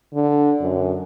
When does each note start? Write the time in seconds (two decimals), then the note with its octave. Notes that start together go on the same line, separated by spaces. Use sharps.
0.14 D3
0.61 F#2